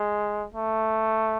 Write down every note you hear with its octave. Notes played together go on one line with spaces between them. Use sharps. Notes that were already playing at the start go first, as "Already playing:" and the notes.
Already playing: G#3
A3